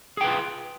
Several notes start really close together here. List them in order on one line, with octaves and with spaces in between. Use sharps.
G#4 G5 B4 F4